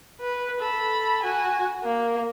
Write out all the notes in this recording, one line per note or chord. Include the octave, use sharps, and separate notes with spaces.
B4
A4 B5
F#4 G#5
A#3